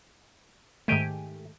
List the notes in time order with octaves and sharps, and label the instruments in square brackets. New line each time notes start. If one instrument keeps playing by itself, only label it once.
[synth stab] G#2 D#3 A3 [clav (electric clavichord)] G4 G5 G#5